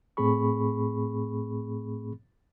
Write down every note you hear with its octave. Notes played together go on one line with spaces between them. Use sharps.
A2 A3 C4 G#4 B5 C#6